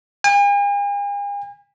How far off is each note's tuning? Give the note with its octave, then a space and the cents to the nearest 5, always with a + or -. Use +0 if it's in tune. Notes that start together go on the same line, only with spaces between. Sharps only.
G#5 -45